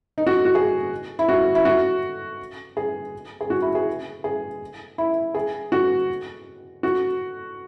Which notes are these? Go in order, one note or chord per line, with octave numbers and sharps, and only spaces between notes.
D#4
F#4
F#4
G#4
E4
F#4
E4
F#4
G#4
G#4
F#4
E4
G#4
G#4
E4
G#4
F#4
F#4